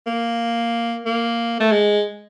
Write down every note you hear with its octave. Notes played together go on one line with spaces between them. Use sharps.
A#3
A#3
A3
G#3